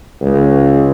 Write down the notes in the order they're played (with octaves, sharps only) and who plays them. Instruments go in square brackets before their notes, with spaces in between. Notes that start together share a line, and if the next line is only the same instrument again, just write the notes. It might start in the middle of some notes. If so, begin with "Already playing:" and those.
[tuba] C#2